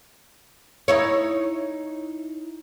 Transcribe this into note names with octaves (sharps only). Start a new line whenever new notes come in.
D#4 E4 C#5